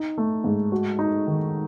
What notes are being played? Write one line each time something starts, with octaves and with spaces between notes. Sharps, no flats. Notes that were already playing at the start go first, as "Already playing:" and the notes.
Already playing: D#4
A3
G#2
F#4
D#4
D#3